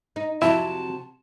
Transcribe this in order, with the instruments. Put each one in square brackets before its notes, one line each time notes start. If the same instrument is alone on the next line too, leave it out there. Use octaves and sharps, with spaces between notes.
[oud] D#4
[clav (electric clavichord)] F2 E4 E5 [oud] C3 F#3 [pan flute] A5